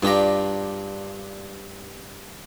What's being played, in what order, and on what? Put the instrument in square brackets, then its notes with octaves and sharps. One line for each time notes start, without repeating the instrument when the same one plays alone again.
[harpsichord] G2 G4 A#5 [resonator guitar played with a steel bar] D4 F4